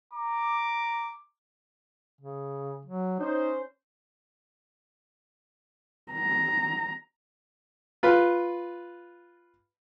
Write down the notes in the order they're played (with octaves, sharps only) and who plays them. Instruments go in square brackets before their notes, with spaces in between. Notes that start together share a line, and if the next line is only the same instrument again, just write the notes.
[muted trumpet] A#5 [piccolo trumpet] D6
[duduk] C#3
F#3
[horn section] C#4 C5 [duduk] D#4
[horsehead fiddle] A#5
[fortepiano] F4 B4 B5